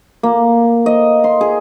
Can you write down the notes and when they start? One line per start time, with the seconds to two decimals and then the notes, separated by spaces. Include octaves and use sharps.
0.23 A#3
0.86 D#5
1.24 C6
1.41 G#4